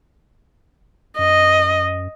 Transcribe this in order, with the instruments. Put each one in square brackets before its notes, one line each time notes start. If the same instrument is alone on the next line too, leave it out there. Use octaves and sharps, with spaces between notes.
[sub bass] F#2 [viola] D#5